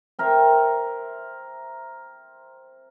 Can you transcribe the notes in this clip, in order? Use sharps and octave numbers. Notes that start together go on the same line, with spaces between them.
C4 A#4 C5 E5